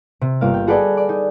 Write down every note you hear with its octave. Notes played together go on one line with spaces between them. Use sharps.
C3
G1 A#3 F5
G5
F#4 G#4 A4 B4 D5 D#5
D5
D#4